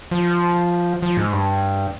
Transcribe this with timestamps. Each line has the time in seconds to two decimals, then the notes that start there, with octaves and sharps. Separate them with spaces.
0.11 F3
1.02 F3
1.17 G#2
1.33 G2